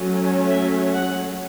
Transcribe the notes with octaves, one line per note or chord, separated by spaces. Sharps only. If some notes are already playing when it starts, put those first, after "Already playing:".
Already playing: F#3 A3 C#4
E5
F#5